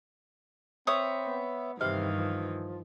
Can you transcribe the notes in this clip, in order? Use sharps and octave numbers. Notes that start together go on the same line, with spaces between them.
C4 B4 C#5 E5 D#6
B3
G2 C3 D#3 E3 F5
F3